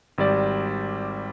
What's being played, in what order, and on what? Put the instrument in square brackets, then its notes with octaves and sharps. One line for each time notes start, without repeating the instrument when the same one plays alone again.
[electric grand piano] G#1 G3 D5